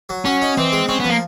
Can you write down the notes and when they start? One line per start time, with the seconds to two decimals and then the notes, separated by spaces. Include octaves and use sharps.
0.09 F#3
0.25 C#4 F#4
0.42 D#4
0.57 E3 C4
0.72 G#3
0.89 C4 C#4
1.00 B3
1.04 F3
1.10 A#3